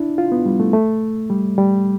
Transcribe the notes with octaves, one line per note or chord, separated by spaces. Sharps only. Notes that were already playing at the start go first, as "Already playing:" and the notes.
Already playing: D4 E4
F4
B3
G3
A3
A3
G3
G3